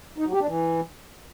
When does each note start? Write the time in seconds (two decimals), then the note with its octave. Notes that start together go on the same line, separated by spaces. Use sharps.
0.18 D#4
0.25 F#3
0.33 G4
0.40 D4
0.48 E3